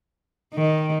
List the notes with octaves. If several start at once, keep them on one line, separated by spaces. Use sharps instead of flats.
D#3